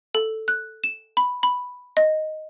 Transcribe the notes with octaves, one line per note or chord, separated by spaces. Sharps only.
A4
F#6
E7
B5
B5
D#5